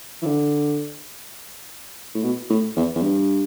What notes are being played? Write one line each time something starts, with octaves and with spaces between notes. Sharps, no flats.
E3
D3
A2
B2
A2
E2
E2
G2